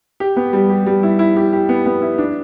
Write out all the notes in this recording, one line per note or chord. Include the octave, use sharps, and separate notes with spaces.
G4
B3
G3
G4
G3
E4
E4
G4
G4
B3
B3
E4
D4